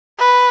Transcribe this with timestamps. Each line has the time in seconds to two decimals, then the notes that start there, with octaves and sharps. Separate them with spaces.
0.19 B4